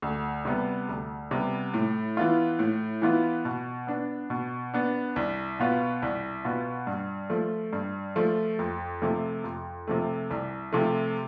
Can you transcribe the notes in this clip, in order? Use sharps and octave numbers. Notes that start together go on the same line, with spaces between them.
D2
C3 G3 B3
D2
C3 G3 B3
A2
E3 B3 F4
A2
E3 B3 F4
B2
B3 D4
B2
B3 D4
C2
B2 B3 F4
C2
B2 B3 F4
G2
F3 A3
G2
F3 A3
F2
C3 F3 A3
F2
C3 F3 A3
C2
C3 F3 A3